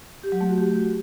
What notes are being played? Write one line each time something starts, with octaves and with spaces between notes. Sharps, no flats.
G4
F#3
A3
F#4
G4